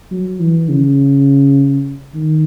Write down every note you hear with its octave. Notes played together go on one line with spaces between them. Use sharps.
F#3
E3
C#3
D#3